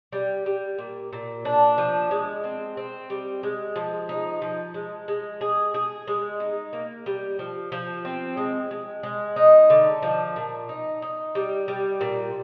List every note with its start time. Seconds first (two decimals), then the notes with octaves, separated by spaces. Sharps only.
0.12 G3
0.46 G3
0.78 A#2
1.13 A#2
1.45 D4
1.78 F3
2.11 G#3
2.44 C4
2.77 C4
3.10 G3
3.43 G#3
3.76 F3
4.09 D#4
4.42 F3
4.74 G#3
5.08 G#3
5.41 G#4
5.74 G#4
6.07 G#3
6.40 D#4
6.73 A#3
7.06 G3
7.39 F3
7.72 F3
8.05 C4
8.37 G#3
8.71 G#3
9.03 G#3
9.36 D#4
9.70 D3
10.02 F3
10.36 A#2
10.69 D#4
11.02 D#4
11.35 G3
11.68 G3
12.01 A#2